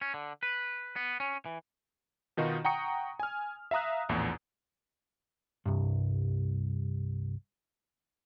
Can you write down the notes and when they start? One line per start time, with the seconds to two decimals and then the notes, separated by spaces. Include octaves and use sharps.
0.01 C#4
0.14 D3
0.43 B4
0.96 B3
1.20 C#4
1.46 E3
2.37 B2 D#3 D#4 F4 F#4
2.65 F#5 G5 A#5 C#6 D#6 C#7
3.20 G#5 F6
3.71 E5 F5 A#5 D#6 F#6
4.09 A#1 E2 A2
5.66 C2 G2